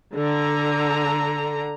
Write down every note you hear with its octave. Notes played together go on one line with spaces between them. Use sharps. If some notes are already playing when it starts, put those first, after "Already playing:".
D3 A#5